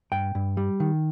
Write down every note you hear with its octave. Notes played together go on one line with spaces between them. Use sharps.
G2 G5
G2
G3
D#3